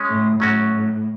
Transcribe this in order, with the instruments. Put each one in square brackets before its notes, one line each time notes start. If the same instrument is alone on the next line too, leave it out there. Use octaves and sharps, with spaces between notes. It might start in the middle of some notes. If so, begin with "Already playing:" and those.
Already playing: [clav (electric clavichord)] G#3 C#4
[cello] A2
[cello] A2 [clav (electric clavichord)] F#3 C#4 F#4